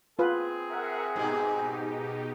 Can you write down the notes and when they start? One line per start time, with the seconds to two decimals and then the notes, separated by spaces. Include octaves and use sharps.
0.19 C4 F4 G#4 B4
0.68 A#4 E5 F#5
1.16 G#2 B2 D#4 G4